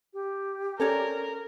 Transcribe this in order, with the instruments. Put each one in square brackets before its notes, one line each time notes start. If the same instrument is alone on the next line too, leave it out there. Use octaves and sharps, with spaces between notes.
[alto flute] G4
[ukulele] C#4 C#5 D5 [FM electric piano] A4 [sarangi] A#4